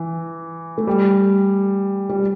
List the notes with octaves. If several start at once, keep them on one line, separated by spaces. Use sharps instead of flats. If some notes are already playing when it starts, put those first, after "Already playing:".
Already playing: E3
A3
G3
G3